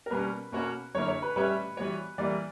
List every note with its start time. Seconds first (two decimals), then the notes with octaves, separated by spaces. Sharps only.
0.06 A#4
0.10 B2 G3 A#3 C#4 B4
0.52 B2 A#3 C#4 F#4 C#5
0.95 F#2 D3 A#3 E4 A#4 C#5
1.08 C#5
1.22 B4
1.36 G3 C#4 G4 B4 C#5 E5
1.77 E3 G3 B3 F#4 C#5
2.18 E3 G3 A#3 D5